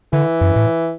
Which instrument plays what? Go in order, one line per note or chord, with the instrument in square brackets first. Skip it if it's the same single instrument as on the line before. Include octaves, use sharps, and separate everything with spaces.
[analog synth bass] D3 [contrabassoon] E3
[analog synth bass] F#2
A2